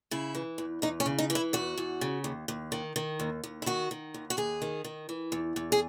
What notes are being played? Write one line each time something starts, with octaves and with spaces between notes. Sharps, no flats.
C#3 E4
E3
E2
E2 D#4
C#4
C#3
D#4
E3
E4
E2 F#4
E2
C#3
D#2
D#2
D#3
D#3
D#2
D#2
E4
D#3 F#4
D#3
D#2
F#4
D#2 G#4
D#3
D#3
E3
E2
E2
G#4